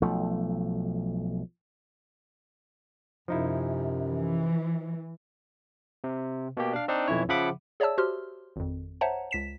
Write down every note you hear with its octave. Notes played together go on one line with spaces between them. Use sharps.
B1 F3 A3
F#2 C3 F3 D#4 E4
E3
C3
B2 A#3 G4
D4 F5
C4 D4 D#4
B1 F2 E3 E4 C#5
C#3 F3 E5 F#5 B5 D6
G#4 C#5 D5 E5 A5 E6
F#4 G4 C5 C6 F6
G#1 F2
C5 C#5 E5 F#5 A5 A#5
C#2 B6 E7